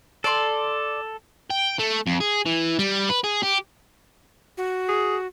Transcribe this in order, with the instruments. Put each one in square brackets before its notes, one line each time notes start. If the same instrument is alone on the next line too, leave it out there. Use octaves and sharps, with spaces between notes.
[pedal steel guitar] A4 [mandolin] D5 C6
[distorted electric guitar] G5
A3
F2
G#4
E3
G3
B4
G#4
G4
[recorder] F#4
[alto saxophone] G#4